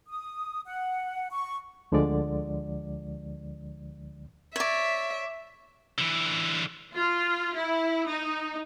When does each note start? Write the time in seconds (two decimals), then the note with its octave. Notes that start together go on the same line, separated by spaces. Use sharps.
0.08 D#6
0.66 F#5
1.31 C#6
1.92 D2 D3 F3 G#3 D5
4.56 C#5 D5 E5
5.98 D3 E3
6.93 F4
7.54 E4
8.06 D#4